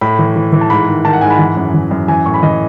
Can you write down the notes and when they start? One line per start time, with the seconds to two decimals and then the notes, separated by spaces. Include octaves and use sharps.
0.01 A2 B5
0.19 E3
0.36 E3
0.52 E3
0.61 A5
0.70 G#2 B5
0.88 D#3
1.05 D#3 A5
1.13 F#5
1.21 G#2 G#5
1.30 B5
1.39 E3
1.56 F#2
1.74 E3
1.91 F#2
2.08 E3 G#5
2.26 A2 C#6
2.34 B5
2.43 E3 D#5